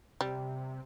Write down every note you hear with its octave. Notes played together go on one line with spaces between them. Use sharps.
C3 G3